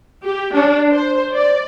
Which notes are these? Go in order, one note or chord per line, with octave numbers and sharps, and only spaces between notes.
G4
D4
C5
D5